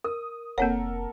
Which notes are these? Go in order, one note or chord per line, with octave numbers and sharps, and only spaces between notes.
A#4 D#6
F1 A#3 C4 A4 A#4 C#5 F#5 A5